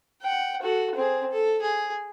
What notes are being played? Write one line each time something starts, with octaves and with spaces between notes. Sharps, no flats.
F#5 G5
F#4 A4
C4 G#4
A4
G#4